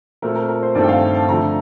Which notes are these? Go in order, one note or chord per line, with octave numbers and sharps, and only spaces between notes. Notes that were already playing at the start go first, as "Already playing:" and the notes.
A#2 A3 C4 A#4
A#4
A#4
C5
G2 D#3 A3 C4 D5
G5
F5
A5
A5
D3 F3 A3 A#5